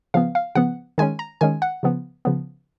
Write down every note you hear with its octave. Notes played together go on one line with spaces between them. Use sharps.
C#3 F3 B3 F5
F5
C#3 F3 B3 F#5
D#3 G#3 C#4 G#5
A#5
D#3 G#3 C#4 G#5
F#5
C#3 F3 B3
C#3 F3 B3